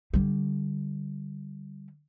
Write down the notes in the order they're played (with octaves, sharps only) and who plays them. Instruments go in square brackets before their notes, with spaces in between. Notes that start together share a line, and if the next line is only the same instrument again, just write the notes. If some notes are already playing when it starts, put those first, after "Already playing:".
[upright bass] D3 G3